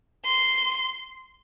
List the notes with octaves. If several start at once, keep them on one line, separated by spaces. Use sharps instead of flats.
C6